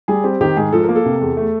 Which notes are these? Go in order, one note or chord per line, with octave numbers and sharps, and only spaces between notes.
G3 G#4
C4 G4
D#3 G4
G#2 G#4
F3 A4
A#4
A#3
A4
C3
E2
A3